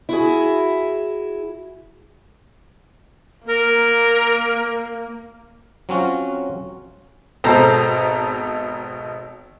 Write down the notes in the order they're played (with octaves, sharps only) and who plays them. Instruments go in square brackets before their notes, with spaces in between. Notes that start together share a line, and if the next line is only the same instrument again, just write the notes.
[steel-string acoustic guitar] E4 F#4 G#4
[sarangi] A#3 [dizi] A#4
[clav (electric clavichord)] F#3 C4 C#4 F4 F#4
[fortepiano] G#1 B2 A4 C5 A#5